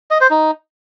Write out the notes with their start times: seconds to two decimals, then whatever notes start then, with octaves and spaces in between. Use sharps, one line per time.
0.11 D#5
0.21 C5
0.31 D#4